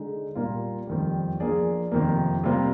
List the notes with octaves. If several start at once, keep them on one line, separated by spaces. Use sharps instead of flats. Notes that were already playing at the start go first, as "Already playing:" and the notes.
Already playing: D3 G#3 D#4
A#2 G3 A#3 F4
F2 D#3 G3
F3 A#3 D4 G#4 D5
F2 C3 D#3 A#3
C3 G3 A#3 F4 C5